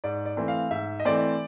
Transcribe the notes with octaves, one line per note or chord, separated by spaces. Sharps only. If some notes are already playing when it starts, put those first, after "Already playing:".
G#2 D5
D5
E3 A3 C4
F5
G#2 E5
D#5
E3 A3 C4 D5